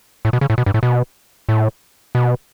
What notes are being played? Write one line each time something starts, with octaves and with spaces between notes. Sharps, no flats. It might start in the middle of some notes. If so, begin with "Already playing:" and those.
A2
B2
C#3
A2
B2
G2
A2
B2
A2
B2